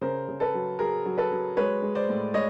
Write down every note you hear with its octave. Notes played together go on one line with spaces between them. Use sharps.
C#3 A#4 C5
C#3
A4 B4
F#3
F#3 G#4 A#4
F#3
A4 B4
F#3
G#3 B4 C#5
G#3
C5 D5
A2
G#3 C#5 D#5